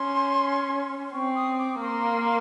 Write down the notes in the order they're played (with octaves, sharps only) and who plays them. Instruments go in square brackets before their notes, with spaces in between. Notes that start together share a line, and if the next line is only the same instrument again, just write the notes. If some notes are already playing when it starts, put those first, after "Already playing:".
Already playing: [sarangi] C#4 [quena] C6
[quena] C6
[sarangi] C4 [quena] C#6
[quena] D#6
D6
[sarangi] A#3 [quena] C#6
[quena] C6